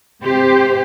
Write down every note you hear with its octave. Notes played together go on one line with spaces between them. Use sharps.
C3 G4 C5